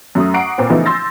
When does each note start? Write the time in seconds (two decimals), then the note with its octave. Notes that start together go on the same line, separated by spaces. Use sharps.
0.15 F#2 A3 D#6
0.34 F#5 A#5 C#6 D6 C7 D7
0.58 A#2 C4 B4
0.70 C#3 E3 F3 A3 B3 D#4
0.86 C6 E6 G6 A6 A#6